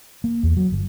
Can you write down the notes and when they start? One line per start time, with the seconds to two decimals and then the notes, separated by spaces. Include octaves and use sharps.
0.24 A#3
0.43 E2
0.57 F#3
0.72 G1